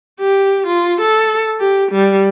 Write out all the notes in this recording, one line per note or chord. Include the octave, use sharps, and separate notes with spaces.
G4
F4
A4
G4
G3